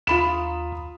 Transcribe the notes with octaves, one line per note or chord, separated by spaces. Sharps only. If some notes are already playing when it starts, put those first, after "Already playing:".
D#2 F4 B5 E7